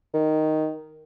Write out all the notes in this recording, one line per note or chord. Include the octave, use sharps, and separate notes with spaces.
D#3